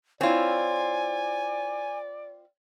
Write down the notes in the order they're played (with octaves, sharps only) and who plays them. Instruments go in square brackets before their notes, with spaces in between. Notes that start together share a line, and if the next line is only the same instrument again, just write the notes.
[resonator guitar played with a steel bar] C4 F4 [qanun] E4 C#5 [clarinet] D5 [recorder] G#5